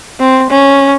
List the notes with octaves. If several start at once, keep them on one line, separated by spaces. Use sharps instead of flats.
C4
C#4